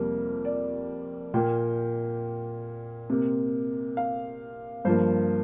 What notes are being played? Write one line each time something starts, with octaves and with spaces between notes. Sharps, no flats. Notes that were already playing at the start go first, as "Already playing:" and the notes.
Already playing: F2 C3 G3 A#3
D5
A#2 A#3 G5
C3 A#3
F5
G2 F3 A#3 C5